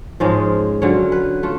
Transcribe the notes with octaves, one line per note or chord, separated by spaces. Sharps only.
G#2 F3 G#3 C#4 F5
D3 F#3 C#4 F4 C#5
B4
A3 F4